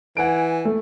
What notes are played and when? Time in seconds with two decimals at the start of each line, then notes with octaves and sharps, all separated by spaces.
0.17 E3 F#5 G#5 D7
0.65 A3